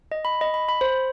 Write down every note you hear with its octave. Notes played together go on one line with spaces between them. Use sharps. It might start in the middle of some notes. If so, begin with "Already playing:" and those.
D#5
B5
D#5
B5
B5
C5